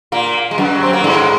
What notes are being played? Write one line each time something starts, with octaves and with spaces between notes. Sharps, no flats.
A#2 A#3
G#3
F#2 F#3
C4
A#3
G#2 G#3